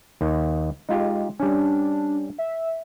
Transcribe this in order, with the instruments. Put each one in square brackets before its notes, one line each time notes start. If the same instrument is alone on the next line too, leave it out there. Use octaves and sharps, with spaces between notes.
[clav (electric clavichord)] D#2 D#3
[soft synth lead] G#3 [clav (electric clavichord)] D#4 F4 G4
[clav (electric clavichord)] G3 C#4 [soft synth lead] D4
[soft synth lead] E5